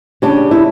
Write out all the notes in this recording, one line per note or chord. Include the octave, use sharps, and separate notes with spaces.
C#3 G3 D4 G4
E4